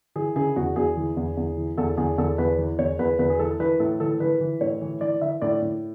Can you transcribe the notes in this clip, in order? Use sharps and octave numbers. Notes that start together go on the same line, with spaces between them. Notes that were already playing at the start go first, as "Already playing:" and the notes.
E3 G#4
C#3 G#4
E2 F#4
E2 G#4
E3
E2
E2
E3
E2 A4
E2 G#4
E2 A4
E2 B4
E3
E2 C#5
E2 B4
E2 B4
G#4
E3 A4
E3 B4
A2 A4
E3 A4
E3 B4
E3
A2 C#5
E3
E3 D5
E3 E5
A2 D5
A2